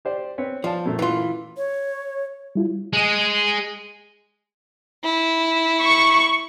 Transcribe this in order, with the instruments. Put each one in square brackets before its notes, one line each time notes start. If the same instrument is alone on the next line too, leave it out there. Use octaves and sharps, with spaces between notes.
[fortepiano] G4 C5 D5
C4 B4 C#5
[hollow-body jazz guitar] F3 [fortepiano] D5 F5 A5
[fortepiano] F#2 A#2 A3
[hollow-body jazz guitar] E3 F4
[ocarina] C#5
[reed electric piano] G3 E4 F4
[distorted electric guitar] G#3 G#4
[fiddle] E4
[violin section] C#6